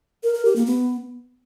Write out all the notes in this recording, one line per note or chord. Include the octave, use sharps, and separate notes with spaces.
A#4
A#4
G4
A#3
B3